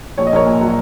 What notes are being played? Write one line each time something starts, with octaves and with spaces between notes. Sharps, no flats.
A#1 C#5
D#5
A#1 A#4 C#5
A#2
F#3